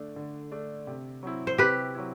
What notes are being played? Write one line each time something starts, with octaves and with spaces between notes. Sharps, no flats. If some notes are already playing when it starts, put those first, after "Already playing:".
Already playing: D3 A3 D4
D3
A3 D4
C3
F#3 C4 E4
C5
C3 G4 B4
F#3 C4 E4